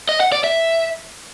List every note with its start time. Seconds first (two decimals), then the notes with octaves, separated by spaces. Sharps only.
0.09 D#5
0.21 F#5
0.32 D5
0.44 E5